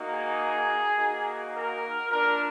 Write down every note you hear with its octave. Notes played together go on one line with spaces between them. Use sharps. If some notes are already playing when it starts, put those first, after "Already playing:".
Already playing: A#3 D#4 F#4
G#4
A#3 D#4 F#4
A#4
A#3 D4 F4 A#4